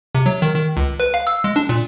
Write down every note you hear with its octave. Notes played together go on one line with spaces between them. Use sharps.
C3
F#3
D#3
D#3
C#2
B4
F5
E6
G#3
D4
A#2